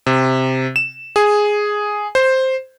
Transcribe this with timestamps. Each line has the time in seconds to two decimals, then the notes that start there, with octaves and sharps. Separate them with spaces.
0.06 C3
0.76 E7
1.16 G#4
2.15 C5